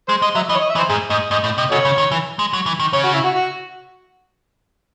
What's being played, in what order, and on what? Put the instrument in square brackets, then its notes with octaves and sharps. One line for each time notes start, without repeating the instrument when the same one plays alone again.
[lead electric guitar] G#3 [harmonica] C5
[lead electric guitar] G#3 [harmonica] D#5
[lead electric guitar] F#3 [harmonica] E5
[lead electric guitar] E3 [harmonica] D#5
[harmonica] C#5
D#5
E5
[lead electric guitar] E3
[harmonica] C5
[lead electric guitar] G#2 [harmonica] G#4
[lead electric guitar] G#2 [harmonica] D#5
[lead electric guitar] G#2 [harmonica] D#5
[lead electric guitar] A2
[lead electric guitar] C3 [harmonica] D#5
[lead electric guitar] C#3 [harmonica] F#4 A4 C#5
[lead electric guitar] C#3
D#3
E3
G#3
F#3
E3
D#3
[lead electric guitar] C#3 [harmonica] C#5
[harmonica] F#4
E4
F#4
F#4